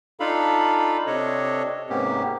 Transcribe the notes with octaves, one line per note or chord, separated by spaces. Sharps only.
D4 D#4 F4 A4 F5 B5
C3 D4 A4 C#5 D#5
G#2 C3 A#3 B3 C#4 G4